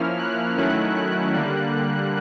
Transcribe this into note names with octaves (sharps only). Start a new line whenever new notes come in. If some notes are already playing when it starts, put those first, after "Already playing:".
Already playing: F3 A#3 C#4 E4 F6
F#6
D#3 F#3 A3 C#4 E4 F#6
F#6
D3 G3 A#3